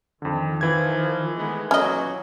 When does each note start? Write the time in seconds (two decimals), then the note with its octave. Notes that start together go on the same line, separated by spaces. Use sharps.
0.22 F2 D3 D#3
0.61 E3 F3 G#6
1.37 G#3 A3 B3
1.71 B1 A#2 F#3 C#4 D#5